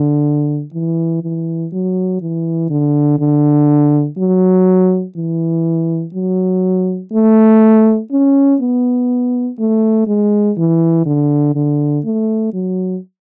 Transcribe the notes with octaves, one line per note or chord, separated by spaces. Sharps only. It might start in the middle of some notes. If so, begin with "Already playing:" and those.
Already playing: D3
E3
E3
F#3
E3
D3
D3
F#3
E3
F#3
A3
C#4
B3
A3
G#3
E3
D3
D3
A3
F#3